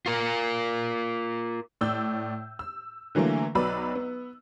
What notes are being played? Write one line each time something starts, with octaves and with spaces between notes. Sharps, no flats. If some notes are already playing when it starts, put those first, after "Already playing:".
F4 A#4
A2 D5 E6 G6
E6
D3 E3 F#3 A3 A#3
B1 F#3 B4 D5 B5 E6
B3